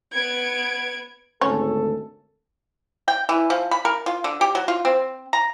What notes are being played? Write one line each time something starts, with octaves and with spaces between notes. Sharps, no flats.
B3 G#6 D7
G#1 D2 C#4 A4
G5
E3
F3
B5
A#4
F4
D3
G4
F#3
F4
C4
A#5